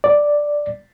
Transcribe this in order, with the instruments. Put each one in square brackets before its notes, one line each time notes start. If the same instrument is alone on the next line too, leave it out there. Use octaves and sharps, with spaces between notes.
[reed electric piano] D5